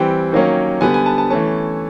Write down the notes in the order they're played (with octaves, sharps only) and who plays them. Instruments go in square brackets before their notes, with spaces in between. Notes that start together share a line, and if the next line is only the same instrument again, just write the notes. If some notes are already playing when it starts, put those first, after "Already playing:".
Already playing: [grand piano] E3 G3 C4 G5
D#3 F#3 A#3 C#4
D3 G3 B3 G#5
G#5
A5
A5
E3 A3 C#4 A5